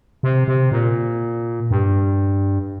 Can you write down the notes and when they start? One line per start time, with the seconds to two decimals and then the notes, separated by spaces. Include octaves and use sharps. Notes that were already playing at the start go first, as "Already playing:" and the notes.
0.23 C3
0.48 C3
0.72 A#2
1.71 G2